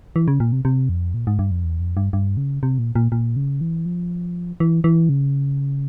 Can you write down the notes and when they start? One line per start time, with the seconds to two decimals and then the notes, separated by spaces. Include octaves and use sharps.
0.16 E3
0.28 C#3
0.40 A#2
0.52 C3
0.65 C3
0.89 F2
1.14 A#2
1.27 G#2
1.39 G2
1.51 F2
1.64 E2
1.80 F2
1.97 G2
2.13 G2
2.37 C#3
2.63 C3
2.79 A#2
2.95 A#2
3.12 A#2
3.36 C#3
3.61 E3
3.86 F3
4.60 E3
4.84 E3
5.09 C#3